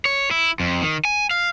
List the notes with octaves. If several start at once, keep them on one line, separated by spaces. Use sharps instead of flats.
C#5
E4
F2
D#3
G#5
F5